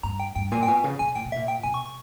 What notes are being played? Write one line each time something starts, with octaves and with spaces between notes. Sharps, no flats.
G2 A#5
G5
G2 G5
A#2 G#5
G5
B2 G#5
C#3
B2 G#5
A#2 G5
B2
E5
A#2
G5
B2 G#5
C#6
C#6